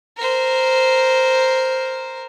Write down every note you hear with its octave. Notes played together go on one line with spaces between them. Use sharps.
A#4 C5